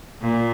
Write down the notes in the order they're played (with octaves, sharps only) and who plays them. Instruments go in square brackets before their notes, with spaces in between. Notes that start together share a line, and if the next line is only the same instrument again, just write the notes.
[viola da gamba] A#2